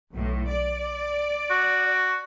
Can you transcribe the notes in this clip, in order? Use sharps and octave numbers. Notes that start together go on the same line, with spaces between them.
B1 A2
D5
F#4